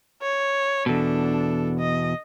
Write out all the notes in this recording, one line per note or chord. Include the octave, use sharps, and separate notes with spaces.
C#5
E2 B2 D4 A4
D#5